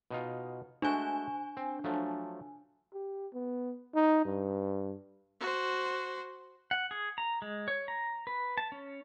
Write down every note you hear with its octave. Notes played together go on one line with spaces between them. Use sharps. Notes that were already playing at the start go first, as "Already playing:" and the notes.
B2 D#4 F4
G#3 A3 D4 F#4 G#5
C4
F3 F#3 A3
G4
B3
D#4
G2
F#4 C5
F#5
G#4
A#5
G#3
C#5
A#5
B4
A5
C#4